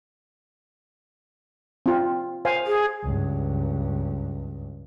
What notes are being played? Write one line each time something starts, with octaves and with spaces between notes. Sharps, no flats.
C4 F4
C5 F5 G#5
G#4
C#2 G2